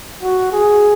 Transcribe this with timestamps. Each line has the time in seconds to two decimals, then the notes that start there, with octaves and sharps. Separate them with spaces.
0.23 F#4
0.53 G#4